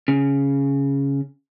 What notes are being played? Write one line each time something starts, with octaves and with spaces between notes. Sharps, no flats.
C#3